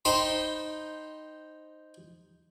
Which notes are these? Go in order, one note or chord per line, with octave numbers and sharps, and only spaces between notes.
D#4 C5 G5 B5 C6